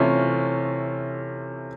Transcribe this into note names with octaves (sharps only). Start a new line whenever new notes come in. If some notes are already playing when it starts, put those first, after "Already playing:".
Already playing: C3 E3 A3 C#4 F4